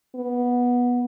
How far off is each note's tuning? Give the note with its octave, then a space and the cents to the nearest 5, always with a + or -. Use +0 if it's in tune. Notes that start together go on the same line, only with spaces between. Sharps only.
B3 -15